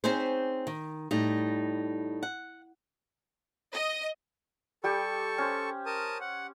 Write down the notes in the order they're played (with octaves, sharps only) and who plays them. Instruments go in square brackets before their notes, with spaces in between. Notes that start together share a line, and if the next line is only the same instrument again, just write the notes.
[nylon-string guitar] C4 C#4 D#4 G#4 C5
D#3
A2 G3 D#4
F#5
[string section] D#5
[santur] G3 G4 G5 [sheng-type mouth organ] A4 C#6
[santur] C#4 C5
[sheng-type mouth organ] A#4 A5 D#6
F#5